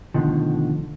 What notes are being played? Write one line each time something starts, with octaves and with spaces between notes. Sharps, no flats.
D2 G2 B2 D3 D#3 F3